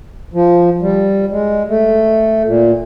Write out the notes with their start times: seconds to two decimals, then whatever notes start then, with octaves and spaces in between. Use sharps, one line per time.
0.34 F3
0.81 G3
1.31 G#3
1.69 A3
2.46 A#2